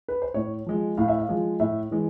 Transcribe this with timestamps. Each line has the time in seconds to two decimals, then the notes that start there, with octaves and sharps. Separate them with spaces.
0.08 B4
0.22 C5
0.34 A2 C#5
0.66 F3 G#3
0.98 A2 F5
1.08 E5
1.19 F5
1.29 F3 G#3
1.60 A2 E5
1.91 E3 G#3